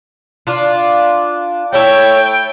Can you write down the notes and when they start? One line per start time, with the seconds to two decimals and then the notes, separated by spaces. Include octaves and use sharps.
0.47 D4 F4
1.73 A3 E4 A4 C#5 G5